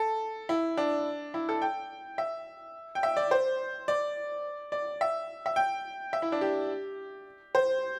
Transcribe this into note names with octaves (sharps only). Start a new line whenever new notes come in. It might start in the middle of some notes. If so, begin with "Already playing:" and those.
Already playing: A4
E4
D4
E4
A4
G5
E5
G5
E5
D5
C5
D5
D5
E5
E5
G5
E5
E4
D4
G4
C5